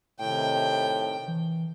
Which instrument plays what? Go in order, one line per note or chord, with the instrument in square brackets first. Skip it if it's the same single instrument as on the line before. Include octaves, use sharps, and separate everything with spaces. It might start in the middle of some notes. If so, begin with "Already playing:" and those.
[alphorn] A2 [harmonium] C3 D#3 [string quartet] G5
[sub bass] E3